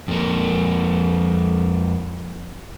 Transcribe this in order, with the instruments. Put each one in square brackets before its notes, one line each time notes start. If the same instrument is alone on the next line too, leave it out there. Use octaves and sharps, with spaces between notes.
[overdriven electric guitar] F2 A#3